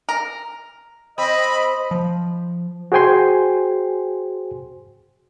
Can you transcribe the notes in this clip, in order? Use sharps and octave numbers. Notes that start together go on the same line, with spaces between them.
A#4
C4 D#5 B5
F3
F#4 G#4 C5 G5 G#5 C6